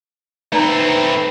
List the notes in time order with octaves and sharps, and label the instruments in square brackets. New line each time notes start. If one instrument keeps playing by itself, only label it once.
[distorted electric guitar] A3 C4 [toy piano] D#4 D5 A#5 [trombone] B4